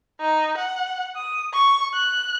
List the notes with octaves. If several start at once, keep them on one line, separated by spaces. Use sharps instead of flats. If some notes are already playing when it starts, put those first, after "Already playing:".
D#4
F#5
D#6
C#6
F#6